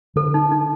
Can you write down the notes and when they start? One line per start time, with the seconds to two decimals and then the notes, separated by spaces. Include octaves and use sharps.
0.16 D3 A4
0.34 D#4
0.52 D#4